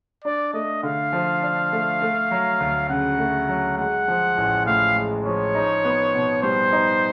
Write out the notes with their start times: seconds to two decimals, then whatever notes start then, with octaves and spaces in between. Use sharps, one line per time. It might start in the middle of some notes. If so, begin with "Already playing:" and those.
0.24 D4 D5
0.53 A3 D#5
0.83 D3 F5
1.13 F3
1.42 D4
1.72 A3
2.01 A3
2.31 F#3
2.60 D2
2.90 C#3 F#5
3.18 A3
3.49 F#3
3.77 G#3 F#5
4.08 F3
4.37 A1
4.66 A2 F5
4.96 G#3
5.25 F3 C#5
5.55 D#4
5.84 B3
6.15 B2
6.43 G3 C5
6.73 D#4